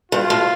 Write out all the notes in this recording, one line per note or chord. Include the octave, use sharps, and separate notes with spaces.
G2 F4
A2